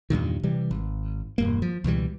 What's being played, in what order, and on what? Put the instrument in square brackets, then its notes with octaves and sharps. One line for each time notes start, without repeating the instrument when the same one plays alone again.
[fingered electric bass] E2 G2 A#2 D#3
C3 E3 G3
G#1
E1 G2 A#3
F3
C#2 B2 E3 G3